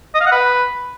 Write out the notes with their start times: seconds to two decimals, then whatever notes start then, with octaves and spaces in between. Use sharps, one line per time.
0.15 D#5
0.21 F5
0.26 F#5
0.32 B4